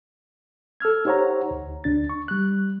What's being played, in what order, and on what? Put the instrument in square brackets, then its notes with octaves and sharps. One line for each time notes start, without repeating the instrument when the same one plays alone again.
[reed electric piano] A4 E6 F6 G#6
D#4 G4 C5 C#5 F#5 A#5
D2
D2 D4 A6
C#6
G3 F#6